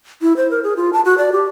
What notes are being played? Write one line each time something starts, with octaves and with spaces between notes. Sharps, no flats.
E4
C5
A#4
G#4
F4
A5
F#4
D5
G4